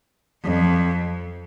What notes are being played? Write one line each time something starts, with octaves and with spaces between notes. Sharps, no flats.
F2